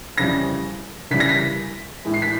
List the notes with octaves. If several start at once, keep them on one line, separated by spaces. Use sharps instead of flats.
F2 C#3 E3 G3 A#6
C#2 C#3 E3 G3 B6
A#6
B6
A2 E3 G#3
C7
B6